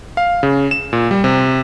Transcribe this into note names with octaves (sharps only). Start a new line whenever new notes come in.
F5
C#3
E7
A#2
G3
C3